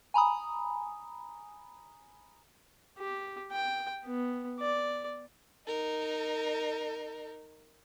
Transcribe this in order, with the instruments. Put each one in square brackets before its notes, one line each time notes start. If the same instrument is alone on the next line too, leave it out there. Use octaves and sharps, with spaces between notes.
[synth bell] G#5 A#5 B5 D#6
[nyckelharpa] G4
G5
B3
D5
[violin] D#4 A#4